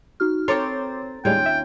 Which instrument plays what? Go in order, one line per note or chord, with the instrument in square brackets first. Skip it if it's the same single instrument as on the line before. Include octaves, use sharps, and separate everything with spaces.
[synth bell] D#4 F#4 F6
[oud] C4 A4 C#5 [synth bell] A#5 A6 [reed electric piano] C6 D6 G6
[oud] D#2 C#4 F4 [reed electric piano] A2 G3 G#3 [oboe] G5
[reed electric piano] E5